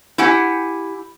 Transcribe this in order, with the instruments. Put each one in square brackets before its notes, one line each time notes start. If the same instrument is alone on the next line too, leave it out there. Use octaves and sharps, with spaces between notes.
[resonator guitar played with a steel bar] E4 G4 F#5 G#5